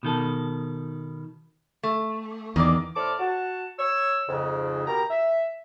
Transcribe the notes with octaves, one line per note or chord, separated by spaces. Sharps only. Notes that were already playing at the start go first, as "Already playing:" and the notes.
B2 D#3 A4
A3
E2 D#3 A#3 D5
A2 A4 C5 D5 D6 F6
F#4 A5
C#5 E6
F2 G#2 C#3
B2 G4 A#4 A#5
E5